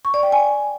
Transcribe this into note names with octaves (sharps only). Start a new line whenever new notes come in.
C#6
D5
G5
G#5